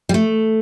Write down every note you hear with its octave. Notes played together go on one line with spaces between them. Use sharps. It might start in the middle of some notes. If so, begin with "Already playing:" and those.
G3
A3